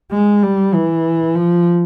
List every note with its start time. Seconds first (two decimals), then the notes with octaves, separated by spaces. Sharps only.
0.12 G#3
0.43 G3
0.74 E3
1.35 F3